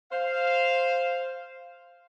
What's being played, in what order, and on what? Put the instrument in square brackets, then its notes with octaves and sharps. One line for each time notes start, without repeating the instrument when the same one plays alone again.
[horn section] C5 F5